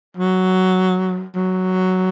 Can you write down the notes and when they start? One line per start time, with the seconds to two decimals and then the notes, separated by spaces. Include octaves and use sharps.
0.17 F#3
1.35 F#3